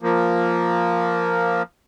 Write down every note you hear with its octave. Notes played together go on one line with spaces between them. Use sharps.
F3 A#3